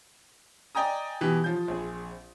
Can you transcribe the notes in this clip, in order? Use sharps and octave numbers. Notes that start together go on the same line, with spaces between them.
D5 D#5 G5 G#5 A#5 D#6
B2 E3 G4
F3 G6
A#1 C4 G#4